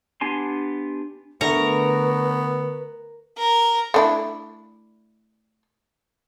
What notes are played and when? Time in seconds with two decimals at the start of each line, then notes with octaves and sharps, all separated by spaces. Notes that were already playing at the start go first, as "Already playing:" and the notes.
0.21 B3 D4 G4 G#5 C6
1.41 D3 A3 B3 A#4 B4 A#5 C#6
3.38 A#4
3.94 A3 D4 E4